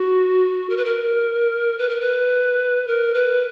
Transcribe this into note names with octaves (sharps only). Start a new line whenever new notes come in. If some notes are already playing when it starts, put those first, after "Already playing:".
Already playing: F#4
A#4
B4
A#4
B4
A#4
B4
A#4
B4